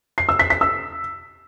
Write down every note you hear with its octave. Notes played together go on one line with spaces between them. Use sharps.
C7
E6
B6
B6
E6